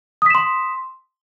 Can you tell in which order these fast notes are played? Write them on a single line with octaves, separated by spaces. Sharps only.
D#6 B6 E7 C6